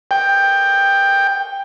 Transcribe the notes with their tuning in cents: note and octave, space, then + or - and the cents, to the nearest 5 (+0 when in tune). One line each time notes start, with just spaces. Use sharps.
G5 +10